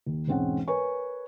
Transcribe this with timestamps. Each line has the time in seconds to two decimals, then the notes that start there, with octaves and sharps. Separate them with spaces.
0.06 D#2
0.27 E1 G#2 C4 C#4 F#5
0.68 A#4 B4 C#5 G#5 C#6